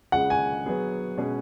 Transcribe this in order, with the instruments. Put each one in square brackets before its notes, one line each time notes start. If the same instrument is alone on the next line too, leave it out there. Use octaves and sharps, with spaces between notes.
[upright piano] C#2 C#3 G#3 [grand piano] F#5
[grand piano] G#5
[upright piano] F#3 B3 G#4 B4
B2 G#3 C#4 G#4